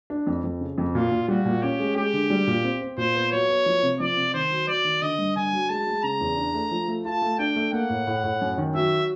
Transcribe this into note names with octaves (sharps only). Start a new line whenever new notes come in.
D4
F2
F2
C#3
F2
A#2 F4
A#2
G3 F#4
A#2
C#4 G4
G#3
G#3 G4
D3
G3
A#2
C4
C4
A#2 C5
B3
F#3 C#5
B3
F3
C3
F3 D5
C3
D#3 C5
F#3
F#3 D5
D#3
D3 D#5
G2
D3 G#5
F#3
G#3 A5
G#3
C#3 A#5
E2
D4
A3
F3
A3
F4 A5
A3
D4 G5
A3
A#3 F#5
A2
A2
A2
F#2
D#3
F#3 E5